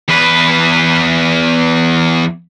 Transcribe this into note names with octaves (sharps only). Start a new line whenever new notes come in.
E2 B4